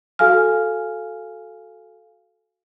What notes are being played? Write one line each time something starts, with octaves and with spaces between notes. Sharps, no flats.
F#4 A4 F5 G#5 F6